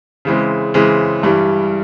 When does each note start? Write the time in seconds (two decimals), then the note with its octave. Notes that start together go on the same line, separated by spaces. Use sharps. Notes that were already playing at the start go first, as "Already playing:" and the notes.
0.25 C#3 E3 G#3 C4
0.74 C#3 E3 G#3 C4
1.23 G2 E3 G3